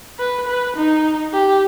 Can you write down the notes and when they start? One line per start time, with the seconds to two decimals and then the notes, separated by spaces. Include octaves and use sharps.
0.19 B4
0.48 B4
0.77 D#4
1.33 G4